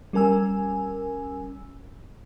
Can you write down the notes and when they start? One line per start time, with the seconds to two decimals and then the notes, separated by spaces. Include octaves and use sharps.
0.13 G3 C#4 A#4 G#5 E6